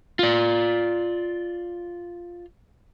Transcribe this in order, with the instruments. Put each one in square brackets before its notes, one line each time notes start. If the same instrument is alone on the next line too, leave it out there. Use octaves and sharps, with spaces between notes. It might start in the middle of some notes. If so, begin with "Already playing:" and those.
[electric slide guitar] F4 D5